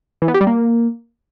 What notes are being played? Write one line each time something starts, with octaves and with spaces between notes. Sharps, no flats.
E3
B3
G4
G3
A#3